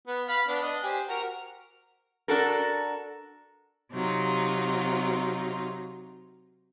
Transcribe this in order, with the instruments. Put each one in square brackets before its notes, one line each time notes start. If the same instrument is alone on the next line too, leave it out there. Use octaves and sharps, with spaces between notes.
[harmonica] B3
F5 B5
B3 D4
D4 D#5
G4 C5 G#5
F#4 A#4 A#5
[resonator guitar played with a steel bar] D4 F#4 A4 A#4
[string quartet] C3 F#3 D#4 F4